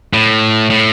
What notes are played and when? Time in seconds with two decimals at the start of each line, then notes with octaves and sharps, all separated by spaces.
0.13 A2
0.70 A2